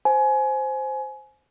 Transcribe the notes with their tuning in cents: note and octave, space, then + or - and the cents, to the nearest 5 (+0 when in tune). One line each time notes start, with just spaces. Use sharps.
C5 +0 G#5 +25